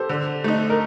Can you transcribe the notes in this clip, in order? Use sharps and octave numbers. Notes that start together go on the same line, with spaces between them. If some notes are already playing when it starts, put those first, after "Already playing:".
Already playing: G4 A4 C5
D3
A3 D#4
A#4